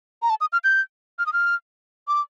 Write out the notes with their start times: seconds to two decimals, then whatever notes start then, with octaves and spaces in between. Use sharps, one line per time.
0.22 A#5
0.30 A5
0.41 D#6
0.53 F6
0.64 G6
1.19 F6
1.26 D#6
1.33 F6
2.08 D6